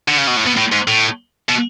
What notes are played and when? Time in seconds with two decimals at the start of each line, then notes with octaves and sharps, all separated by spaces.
0.08 D3
0.18 C#3
0.28 B2
0.37 A2
0.47 B2
0.57 A2
0.72 G#2
0.88 A2
1.49 B2